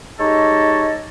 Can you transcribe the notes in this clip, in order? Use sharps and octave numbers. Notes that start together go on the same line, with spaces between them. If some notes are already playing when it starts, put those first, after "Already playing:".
G#3 D#4 G4 A4 C#5 D#5